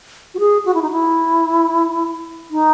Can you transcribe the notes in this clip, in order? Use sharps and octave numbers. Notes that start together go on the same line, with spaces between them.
F#4
G#4
F#4
E4
D#4
E4
D#4